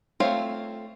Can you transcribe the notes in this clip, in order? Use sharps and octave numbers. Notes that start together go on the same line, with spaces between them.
A3 C4 F4 C#5 F5